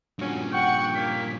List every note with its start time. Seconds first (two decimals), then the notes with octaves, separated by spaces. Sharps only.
0.19 G2 A#2 C#4 F#4
0.53 F#5 G5 C#6
0.95 A#3 A#4 C#5 B6